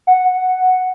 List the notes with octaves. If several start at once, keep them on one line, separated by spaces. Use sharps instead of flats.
F#5